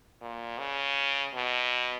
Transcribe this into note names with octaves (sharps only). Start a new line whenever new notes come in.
A#2
C#3
B2